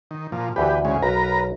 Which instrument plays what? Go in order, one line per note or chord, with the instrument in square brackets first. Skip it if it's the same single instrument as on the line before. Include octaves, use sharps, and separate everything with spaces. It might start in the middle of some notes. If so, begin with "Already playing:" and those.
[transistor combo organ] D#3
A#2 F3
[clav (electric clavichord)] D2 E3 [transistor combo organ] G4 B4
[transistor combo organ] C#3 G#3
[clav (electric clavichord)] B1 [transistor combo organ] A#4 B4 A#5